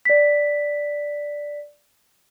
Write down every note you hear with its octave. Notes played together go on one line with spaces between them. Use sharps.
D5 B6